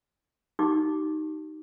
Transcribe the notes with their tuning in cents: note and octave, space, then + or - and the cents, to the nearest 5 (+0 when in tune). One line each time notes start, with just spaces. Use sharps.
D#4 +0 G4 -35 D6 +0